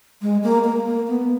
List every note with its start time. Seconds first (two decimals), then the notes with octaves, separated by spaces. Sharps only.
0.22 G#3
0.44 A#3
0.64 A#3
0.86 A#3
1.08 B3